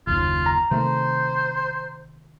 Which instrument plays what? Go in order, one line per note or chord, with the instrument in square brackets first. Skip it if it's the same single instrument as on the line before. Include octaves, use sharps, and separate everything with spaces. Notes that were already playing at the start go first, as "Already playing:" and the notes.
[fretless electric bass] F#1 D#2 [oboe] F4
[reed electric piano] A#5
[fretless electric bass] C3 D#3 A3 [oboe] C5